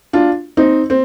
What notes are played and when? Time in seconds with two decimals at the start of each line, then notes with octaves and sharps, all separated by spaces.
0.13 D4 F4
0.57 C4 D#4
0.90 C4